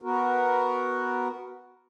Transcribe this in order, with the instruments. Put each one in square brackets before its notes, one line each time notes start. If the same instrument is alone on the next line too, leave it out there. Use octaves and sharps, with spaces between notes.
[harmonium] B3 F#4 A#4